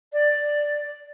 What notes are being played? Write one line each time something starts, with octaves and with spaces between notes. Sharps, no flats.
D5